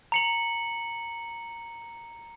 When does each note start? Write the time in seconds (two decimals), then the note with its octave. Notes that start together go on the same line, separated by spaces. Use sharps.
0.12 A#5 C#7 F#7